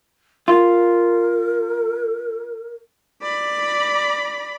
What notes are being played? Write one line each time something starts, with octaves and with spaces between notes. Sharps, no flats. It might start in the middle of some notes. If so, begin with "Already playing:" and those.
F4 A#4
D5 B5